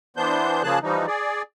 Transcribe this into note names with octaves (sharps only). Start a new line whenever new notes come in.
E3 B3 D4 C5 G6
C#3 F3 A#3 G#4 A5 F#6
E3 F3 G3 D#4
G#4 D5